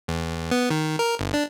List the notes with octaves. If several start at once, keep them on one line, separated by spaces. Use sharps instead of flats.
E2
B3
D#3
A#4
G1
D4